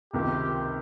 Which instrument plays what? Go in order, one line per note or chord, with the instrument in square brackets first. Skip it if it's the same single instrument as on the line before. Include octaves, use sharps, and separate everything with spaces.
[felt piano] C#2 C3 D#3 A#3 F4 [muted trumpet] G4